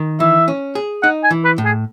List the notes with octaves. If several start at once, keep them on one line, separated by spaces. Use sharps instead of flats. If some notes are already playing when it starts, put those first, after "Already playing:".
Already playing: D#3
E3 E5
C#4
G#4
D#4 F#5
G#5
E3
B4
A2
G#4